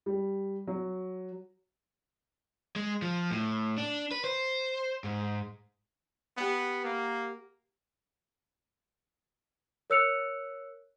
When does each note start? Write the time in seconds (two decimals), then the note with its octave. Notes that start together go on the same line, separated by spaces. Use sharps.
0.06 G3
0.67 F#3
2.76 G#3
3.02 F3
3.31 A2
3.77 D4
4.11 B4
4.24 C5
5.04 G#2
6.37 B3 G4 F#5
6.84 A#3
9.90 A#4 C#5 E6 F#6 C#7 F7